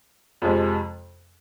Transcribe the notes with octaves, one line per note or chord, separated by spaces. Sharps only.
F2 C3 F3 G#3